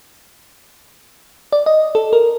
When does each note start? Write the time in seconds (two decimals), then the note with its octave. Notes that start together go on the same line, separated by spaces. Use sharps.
1.53 D5
1.66 D#5
1.95 A4
2.13 A#4